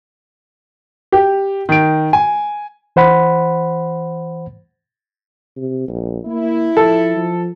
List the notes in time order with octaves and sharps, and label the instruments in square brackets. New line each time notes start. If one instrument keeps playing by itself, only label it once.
[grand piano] G4
D#3 D7
G#5
[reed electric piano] E3 C5 F#5 B5
[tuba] C3
A#1
[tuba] A#3 [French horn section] E4
[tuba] F3 [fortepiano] A4
[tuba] F3